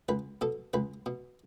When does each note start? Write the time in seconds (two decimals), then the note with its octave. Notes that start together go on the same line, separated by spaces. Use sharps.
0.09 C#2 B4
0.41 B2 A4
0.74 C#2 B4
1.06 B2